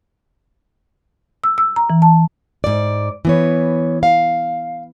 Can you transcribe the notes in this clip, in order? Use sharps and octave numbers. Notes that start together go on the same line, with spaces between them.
E6
E6
A#5
E3
A5
G#2 D5
E3 B3 C#5
F5